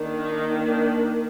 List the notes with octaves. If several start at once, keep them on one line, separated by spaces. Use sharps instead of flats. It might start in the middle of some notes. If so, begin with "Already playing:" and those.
Already playing: D#3 A#3 D4
D#4
D4